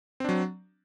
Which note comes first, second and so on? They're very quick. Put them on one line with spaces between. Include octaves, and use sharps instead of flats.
C4 D4 F#3